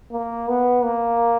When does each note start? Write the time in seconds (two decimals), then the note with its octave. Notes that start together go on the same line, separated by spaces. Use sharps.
0.12 A#3
0.48 B3
0.84 A#3